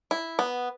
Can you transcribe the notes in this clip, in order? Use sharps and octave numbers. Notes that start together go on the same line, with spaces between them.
E4
B3